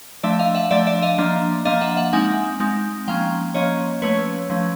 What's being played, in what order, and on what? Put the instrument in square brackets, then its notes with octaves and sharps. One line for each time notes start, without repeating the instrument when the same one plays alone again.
[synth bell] F3 A3 D4 D5 E5
D#5 F5
E5 F#5
F3 A3 D4 D5 E5
D5 E5
D#5 F5
F3 A#3 D4
F3 A#3 D4 D#5 F5
E5 F#5
E5 F#5
G#3 C4 D#4 F#5 G#5
G#3 C4 D#4
F3 A#3 C#4 F5 G5
F3 A#3 C#4 C#5 D#5
F3 A3 C#4 B4 C#5
F3 A3 C#4